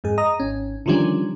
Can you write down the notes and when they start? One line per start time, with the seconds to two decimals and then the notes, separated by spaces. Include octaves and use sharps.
0.04 F2 G#2 G#4
0.18 D#5 A#5 D#6
0.40 G#1 C#4
0.86 D3 D#3 F3 G3 C#4